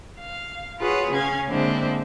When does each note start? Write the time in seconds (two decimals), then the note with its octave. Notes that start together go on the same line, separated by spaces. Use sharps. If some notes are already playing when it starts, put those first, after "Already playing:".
0.19 F5
0.79 F4 F#4 G#4 B4 C#5
1.11 C#3 C#4 F5 G#6
1.47 A#2 D3 G#3 C4 E4